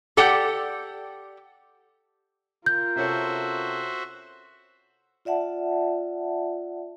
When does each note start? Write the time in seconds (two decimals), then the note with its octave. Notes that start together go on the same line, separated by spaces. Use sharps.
0.17 G4 A4 D5 F#5 G5
2.66 F4 A#4 G6
2.96 C3 C#4 F#4 A4 C5 E5
5.25 F4 D5 E5 F#5 A5